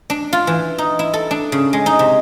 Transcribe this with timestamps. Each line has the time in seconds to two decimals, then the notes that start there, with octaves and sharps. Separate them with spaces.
0.10 D4
0.33 F4
0.47 E3
0.78 D#4
0.99 E4
1.14 A4
1.31 D4
1.52 C#3
1.73 G#3
1.86 D#4
1.99 C3